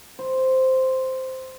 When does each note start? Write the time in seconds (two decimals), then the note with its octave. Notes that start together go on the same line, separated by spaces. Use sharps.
0.19 C5